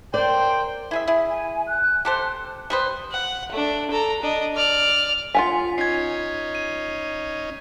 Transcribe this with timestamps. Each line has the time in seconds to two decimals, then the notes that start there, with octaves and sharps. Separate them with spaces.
0.14 A#4 C5 D5 G5
0.91 E4 G#4 E5
1.08 E4 G#4 E5
1.29 G#5
1.66 F#6
2.05 G4 A4 C5
2.70 G3 B4 C5 D#6
3.11 F#5
3.52 A3 D4
3.90 A4 A#5
4.22 D4 D#5
4.55 D5 F6
5.35 F4 F#5 G#5 B6
5.78 C#4 D#4 G#6 C7
6.55 D#7